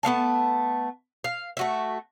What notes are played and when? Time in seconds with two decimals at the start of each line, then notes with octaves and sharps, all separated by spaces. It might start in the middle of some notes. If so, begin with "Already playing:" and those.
0.03 A3 B3 F5 A5
1.24 F5
1.57 A3 F#4 E5